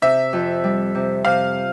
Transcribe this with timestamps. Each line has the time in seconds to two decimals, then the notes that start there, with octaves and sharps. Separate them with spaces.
0.02 C3 E5
0.33 F2
0.64 G3
0.95 C3
1.25 C3 F5